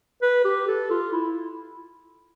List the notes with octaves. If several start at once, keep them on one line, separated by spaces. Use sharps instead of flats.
B4
G4
A4
F4
E4